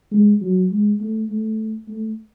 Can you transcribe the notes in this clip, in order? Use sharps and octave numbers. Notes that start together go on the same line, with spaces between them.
G#3
F#3
G#3
A3
A3
A3